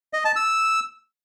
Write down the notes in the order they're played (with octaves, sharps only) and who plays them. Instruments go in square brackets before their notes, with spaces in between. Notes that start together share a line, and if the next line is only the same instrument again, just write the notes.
[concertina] D#5
A5
E6